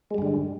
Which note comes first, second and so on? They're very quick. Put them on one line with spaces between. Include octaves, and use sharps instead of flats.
G#3 G3 G2 D3